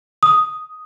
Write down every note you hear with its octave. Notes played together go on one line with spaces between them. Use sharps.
D#6